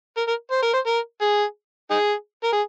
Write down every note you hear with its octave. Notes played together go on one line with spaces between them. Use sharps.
A#4
A#4
C5
A#4
C5
A#4
G#4
D#4 G#4
A#4
G#4